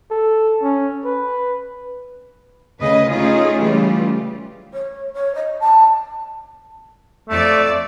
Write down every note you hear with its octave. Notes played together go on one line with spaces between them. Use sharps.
A4
C#4
B4
D2 C#3 B4 D#5
A3 C#4 D#4 F4 G#4
C#3 E3 G3 A3 F4 G4
C#5
C#5
D#5
A5
F2 A3 D5